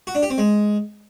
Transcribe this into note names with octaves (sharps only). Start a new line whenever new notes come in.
F#4
D4
G4
C4
G#3